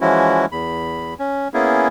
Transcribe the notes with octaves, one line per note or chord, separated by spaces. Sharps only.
E3 F3 G#3 C#4 E4 F#4
E2 B5
C#4
A#3 B3 C#4 E4 G#4